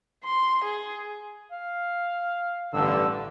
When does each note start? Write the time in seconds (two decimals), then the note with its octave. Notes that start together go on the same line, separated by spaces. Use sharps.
0.24 C6
0.64 G#4
1.51 F5
2.73 A1 G2 D3 E6